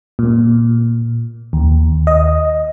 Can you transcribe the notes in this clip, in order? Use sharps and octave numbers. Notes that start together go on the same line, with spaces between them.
A#2
D#2
D#5